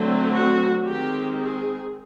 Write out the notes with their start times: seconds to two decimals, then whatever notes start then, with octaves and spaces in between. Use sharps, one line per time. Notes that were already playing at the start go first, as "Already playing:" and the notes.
Already playing: D3 F#3 A3 C4
0.33 F#4
0.87 D#3 G#3 C4 G4
1.41 G#4